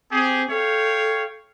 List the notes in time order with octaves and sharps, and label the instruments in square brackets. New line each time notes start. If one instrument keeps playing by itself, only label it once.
[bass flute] C4 [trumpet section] G4 G#4
[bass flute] A4 [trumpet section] C#5 F5 G5